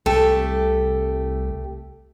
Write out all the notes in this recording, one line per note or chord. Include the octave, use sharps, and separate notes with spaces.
C2 A3 G4 A4